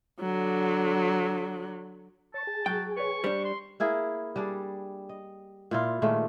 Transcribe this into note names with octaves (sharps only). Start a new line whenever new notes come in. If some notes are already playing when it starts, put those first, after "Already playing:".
D3 F#3
C#5 A5
G#4
F#3 G5
B4 C#5 C#6
G3 D4 C5
C6
A#3 E4 G#4 A#4
G3 D4 G#4
D#5
A#2 E4 F4
A#2 D#3 G#3 A3